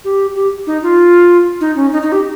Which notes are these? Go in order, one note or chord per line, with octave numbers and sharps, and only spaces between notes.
G4
G4
D#4
F4
D#4
C#4
D#4
D#4
G4